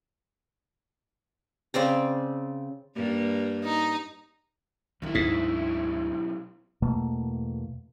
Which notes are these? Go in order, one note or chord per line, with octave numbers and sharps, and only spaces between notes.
C#3 C4 D5 A#5
G2 A#3
D#4
B1 D#3 E3 E4
D2 G#2
E2 B2 A3 A#3